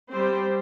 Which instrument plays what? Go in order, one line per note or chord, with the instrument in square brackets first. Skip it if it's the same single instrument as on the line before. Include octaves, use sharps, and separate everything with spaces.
[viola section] G3 C4 G4 C5